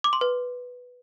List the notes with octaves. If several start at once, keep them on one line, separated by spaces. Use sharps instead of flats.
D6
C6
B4